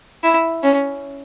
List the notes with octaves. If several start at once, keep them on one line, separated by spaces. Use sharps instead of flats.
E4
C#4